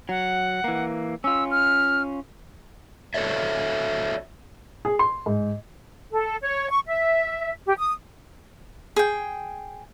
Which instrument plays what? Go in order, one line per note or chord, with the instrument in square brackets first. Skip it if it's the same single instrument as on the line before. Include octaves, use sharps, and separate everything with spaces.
[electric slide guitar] F#3 [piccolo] F#5
[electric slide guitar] E3 A#3
[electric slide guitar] C#4 F4 [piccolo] E6
[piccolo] F6
[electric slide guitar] F#4 A4 C#5 D5 E5
[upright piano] G#4
C6
G#2
[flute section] A4
C#5
C#6
E5
G4
D#6
[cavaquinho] G#4 G5